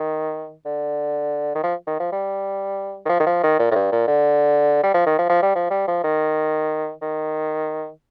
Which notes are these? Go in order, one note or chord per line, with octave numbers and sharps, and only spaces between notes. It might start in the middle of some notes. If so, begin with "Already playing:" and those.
Already playing: D#3
D3
D#3
F3
D#3
F3
G3
D#3
F3
D#3
F3
D#3
A#2
A2
G2
A#2
D3
G3
F3
D#3
F3
F3
G3
F3
G3
F3
D#3
D#3